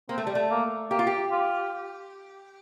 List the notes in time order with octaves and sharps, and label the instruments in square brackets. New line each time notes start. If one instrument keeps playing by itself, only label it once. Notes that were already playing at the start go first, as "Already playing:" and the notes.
[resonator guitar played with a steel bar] A#3 [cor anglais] C4
[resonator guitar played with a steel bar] A3
G3
A3
[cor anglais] A#3
[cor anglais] A#3 [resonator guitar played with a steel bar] G4
[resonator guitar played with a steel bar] F4
G4
[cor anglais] F4